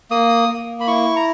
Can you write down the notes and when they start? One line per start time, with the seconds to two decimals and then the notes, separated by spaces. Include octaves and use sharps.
0.11 A#3 D#6
0.49 A#3
0.80 B5
0.87 E4 C#6
1.16 A#5